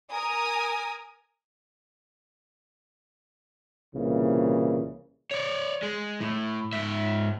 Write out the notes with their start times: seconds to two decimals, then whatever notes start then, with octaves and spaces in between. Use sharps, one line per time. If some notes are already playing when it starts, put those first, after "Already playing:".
0.11 A#4 G#5 D#6
3.95 C2 A#2 C#3 E3 A#3
5.31 C#5 D5
5.83 G#3
6.21 A2
6.73 G#2 E5